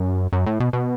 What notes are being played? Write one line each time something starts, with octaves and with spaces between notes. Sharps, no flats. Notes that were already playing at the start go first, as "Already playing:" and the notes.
Already playing: F#2
F#2
A2
B2
B2